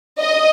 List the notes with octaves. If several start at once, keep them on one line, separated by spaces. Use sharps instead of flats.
D#5